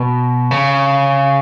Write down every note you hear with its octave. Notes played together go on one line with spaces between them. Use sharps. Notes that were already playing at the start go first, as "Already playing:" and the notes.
Already playing: B2
C#3